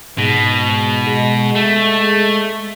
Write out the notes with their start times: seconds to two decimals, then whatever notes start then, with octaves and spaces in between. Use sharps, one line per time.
0.18 G#2 B2
1.07 G#3
1.55 A3